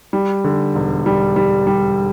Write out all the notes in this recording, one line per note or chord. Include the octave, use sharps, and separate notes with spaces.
G3
D3
E1
G3
G3
G3